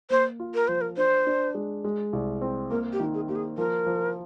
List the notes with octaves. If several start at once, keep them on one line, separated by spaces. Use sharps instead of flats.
A#3 C5
F4
A#4
F3 C5
A#4
D4 C5
D4
G#3
G#3
C2
C4
A#3 A#4
G4
D#3
G#4
A#3 G4
G#4
F3 A#4
F3